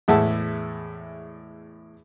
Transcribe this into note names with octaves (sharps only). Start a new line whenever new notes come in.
E2 A2 G#3 E5 F#5 A5